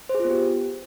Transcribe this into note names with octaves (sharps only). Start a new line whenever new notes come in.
C5
G#4
F4
B3
G4